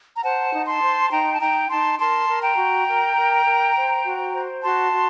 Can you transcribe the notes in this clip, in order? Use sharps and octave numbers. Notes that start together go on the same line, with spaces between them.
A#5
C5 F#5 A5
D#4
A5 C6
C5
D#4 G5 A#5
A5
D#4 G5 A#5
D#4 A5 C6
A#4 A5 C6
A#4
G5 A#5
F#4
A#4
A#4
A#4
C5
F#4
C5
F#4 A5 C6
F#4